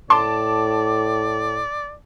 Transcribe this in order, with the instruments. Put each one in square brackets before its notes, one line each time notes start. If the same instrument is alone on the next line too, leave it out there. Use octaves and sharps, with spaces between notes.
[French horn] A2 [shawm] D5 [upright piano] A5 D6 [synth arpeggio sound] C6